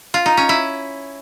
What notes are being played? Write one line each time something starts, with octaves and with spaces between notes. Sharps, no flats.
F4
D#4
C#4
E4